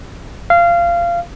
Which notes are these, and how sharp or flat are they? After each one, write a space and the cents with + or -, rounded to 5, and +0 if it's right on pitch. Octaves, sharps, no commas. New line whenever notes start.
F5 -20